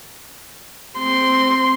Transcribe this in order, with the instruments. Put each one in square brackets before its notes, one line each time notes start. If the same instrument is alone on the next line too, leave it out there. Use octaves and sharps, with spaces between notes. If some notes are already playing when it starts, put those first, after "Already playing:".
[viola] C4 C6